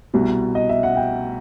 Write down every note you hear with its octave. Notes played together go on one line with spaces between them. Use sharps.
C2 B2
D#5
E5
F#5
G5